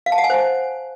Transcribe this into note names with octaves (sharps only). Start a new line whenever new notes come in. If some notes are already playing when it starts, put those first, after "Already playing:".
F5
A5
F#5
G#5
C5